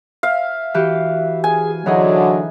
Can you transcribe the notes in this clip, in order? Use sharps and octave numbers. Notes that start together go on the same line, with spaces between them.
E5 F5
E3 F#4 G4
G#4 G#5
D3 E3 F#3 D#4 G#4 D#5